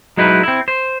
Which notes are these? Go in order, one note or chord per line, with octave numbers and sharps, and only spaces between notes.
F#3 G#3 D#4 E4 B4
C4 E4
C5